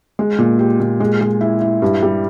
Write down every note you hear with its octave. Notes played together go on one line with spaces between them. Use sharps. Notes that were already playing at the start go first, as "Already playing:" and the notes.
G#3
A#2
G4
A#2
G#3
G#3
E4
E4
G2
G3